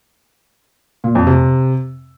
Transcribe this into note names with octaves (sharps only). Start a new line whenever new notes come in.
A#2
F2
C3